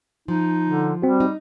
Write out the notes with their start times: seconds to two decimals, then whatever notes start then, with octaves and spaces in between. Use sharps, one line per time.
0.28 F3 D#4
0.67 D3
1.02 G3 C4 F#4
1.20 D#4